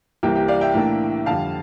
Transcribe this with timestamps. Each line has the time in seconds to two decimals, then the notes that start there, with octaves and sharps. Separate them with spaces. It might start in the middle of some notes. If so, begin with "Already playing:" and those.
0.23 C2 C3 E3 A#3 G4
0.35 G4
0.48 D5 F5
0.61 E5 G5
0.74 A2 E3 A#3 D4
1.26 F2 D3 G3 F5 A5